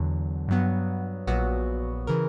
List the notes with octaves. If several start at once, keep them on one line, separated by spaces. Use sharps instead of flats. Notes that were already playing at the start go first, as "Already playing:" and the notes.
Already playing: E2 D3 F#3
G2 F#3 B3
A#1 A#2 F#3 B3 F#4
C#3 E3 A#4